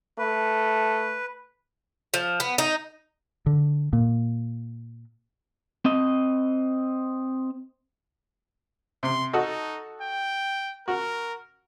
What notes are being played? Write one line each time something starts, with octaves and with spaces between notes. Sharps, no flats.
A3 B4
F3
B3
D#4
D3
A#2
C4 D#5
C3 C6
D#4 F#4 A4 D#5
G5
F#4 A#4